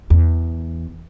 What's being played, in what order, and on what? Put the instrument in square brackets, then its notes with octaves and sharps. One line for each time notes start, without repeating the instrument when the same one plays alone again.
[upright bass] E2